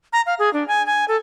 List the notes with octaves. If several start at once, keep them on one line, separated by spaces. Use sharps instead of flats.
A#5
F5
G#4
D4
G#5
G#5
A4